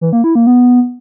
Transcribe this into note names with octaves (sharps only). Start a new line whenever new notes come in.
E3
A#3
E4
A#3
B3